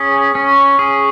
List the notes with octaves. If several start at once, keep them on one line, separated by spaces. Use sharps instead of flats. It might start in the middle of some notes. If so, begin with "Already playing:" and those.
Already playing: C#4 G#4
C#4
G#4